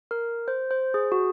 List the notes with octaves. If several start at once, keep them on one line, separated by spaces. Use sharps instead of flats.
A#4
C5
C5
G#4
F#4